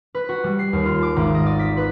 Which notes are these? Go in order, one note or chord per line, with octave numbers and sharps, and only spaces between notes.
B4
F#4
G3
C7
D#2
F4
D6
G#1
D#5
D5
B6
B4